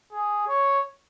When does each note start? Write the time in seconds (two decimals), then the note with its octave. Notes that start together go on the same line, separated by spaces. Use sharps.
0.12 G#4
0.48 C#5